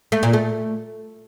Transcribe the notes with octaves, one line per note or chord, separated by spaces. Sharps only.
A3
A#2
A3